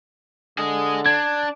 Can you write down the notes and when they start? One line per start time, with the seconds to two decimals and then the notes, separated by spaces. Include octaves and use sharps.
0.58 D3 G#4 D#5
1.06 D4 G#6